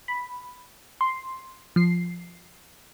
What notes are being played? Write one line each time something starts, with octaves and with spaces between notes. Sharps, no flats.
B5
C6
F3 C7